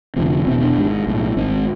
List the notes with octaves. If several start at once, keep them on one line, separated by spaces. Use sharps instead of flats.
F1 F2 D3 C4
E1 E2 B2 C4
D4
G#1 G#2
B1 A2
G#1 G#2 C4